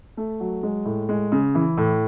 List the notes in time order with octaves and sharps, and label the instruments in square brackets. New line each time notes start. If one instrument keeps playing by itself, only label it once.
[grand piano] A3
F#3
G#3
A2
G#3
C#3
E3
A2